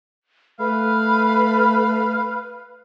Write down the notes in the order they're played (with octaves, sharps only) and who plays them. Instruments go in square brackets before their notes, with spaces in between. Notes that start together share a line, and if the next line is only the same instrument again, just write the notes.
[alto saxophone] A3 [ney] B4 [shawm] F5 [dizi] B5